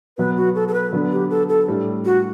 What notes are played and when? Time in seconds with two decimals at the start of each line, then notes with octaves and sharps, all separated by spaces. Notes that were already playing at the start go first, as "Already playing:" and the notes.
0.18 B2 F#3 B3 B4
0.37 F#4
0.55 A4
0.68 A4
0.74 B4
0.93 D3 F#3 B3 D4
1.12 G4
1.30 A4
1.49 A4
1.68 A2 G3 D4
2.05 F#4